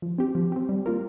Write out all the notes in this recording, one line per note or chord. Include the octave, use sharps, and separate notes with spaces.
F3
C4 G4
F3
C4 G4
G3
A#3 F4 A#4